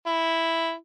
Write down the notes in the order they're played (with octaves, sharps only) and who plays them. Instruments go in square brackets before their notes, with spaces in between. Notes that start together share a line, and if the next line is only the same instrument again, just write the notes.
[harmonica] E4